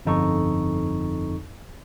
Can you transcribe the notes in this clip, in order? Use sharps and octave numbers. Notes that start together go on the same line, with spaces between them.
G1 F2 D#4 A4 C#6